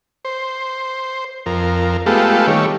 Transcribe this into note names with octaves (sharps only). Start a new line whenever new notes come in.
C5
F2 A#4
G#3 A3 B3 F4 G4 A4
D#3 G3 A3 C#5